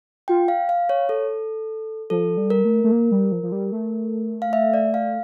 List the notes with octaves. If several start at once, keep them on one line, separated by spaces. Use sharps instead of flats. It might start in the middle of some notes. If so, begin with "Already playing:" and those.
F4 G5
F5
F5
C#5
A4
F3 A4
G3
A#4
A3
A3
A#3
G3
F3
F3
G3
A3
F5
E5
D5
F5